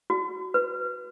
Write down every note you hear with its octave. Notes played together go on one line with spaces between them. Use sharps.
F#4
B4